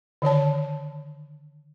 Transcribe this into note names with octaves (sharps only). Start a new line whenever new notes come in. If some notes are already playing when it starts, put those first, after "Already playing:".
D3 D#3 C#5 A5